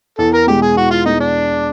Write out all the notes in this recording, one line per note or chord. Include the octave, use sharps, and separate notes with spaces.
E2 A4
A#4
B2 G#3 G4
G#4
E2 F#4
F4
B2 G#3 D#4
D4